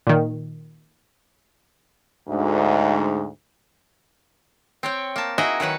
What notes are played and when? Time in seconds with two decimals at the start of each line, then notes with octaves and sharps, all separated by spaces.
0.07 A#2 D#3
2.29 D2 G#2
4.83 C4 C#5 G5
5.16 A#3 A5
5.38 D#4 E4 F#4 G#4 D#5 E5
5.60 D#3 F#3 B4 F#5